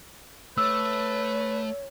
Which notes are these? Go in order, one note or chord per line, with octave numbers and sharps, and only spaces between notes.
A3 B4 C#5 E6